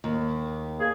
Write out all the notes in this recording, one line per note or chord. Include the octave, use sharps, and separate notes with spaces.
D#2
A#3 G#4